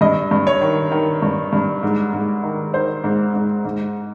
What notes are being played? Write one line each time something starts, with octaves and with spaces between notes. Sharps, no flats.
G2 D#5
G2
C#5
D#3
D#3
G2
G2
G#2
G#2
D#3
D#3 C5
G#2
G#2
G#2